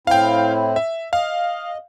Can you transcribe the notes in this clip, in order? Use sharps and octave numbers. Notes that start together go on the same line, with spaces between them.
A2 C4 E4 F5 G5
E5
D#5 F5